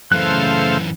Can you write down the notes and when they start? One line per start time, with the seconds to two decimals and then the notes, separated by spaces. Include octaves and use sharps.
0.12 F#2 C#3 E3 A3 A4 C5 F5 F#6